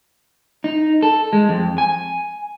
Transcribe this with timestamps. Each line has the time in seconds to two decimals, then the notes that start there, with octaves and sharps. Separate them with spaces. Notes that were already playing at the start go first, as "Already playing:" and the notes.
0.64 D#4
1.03 A4
1.33 G#3
1.49 F2
1.78 G#5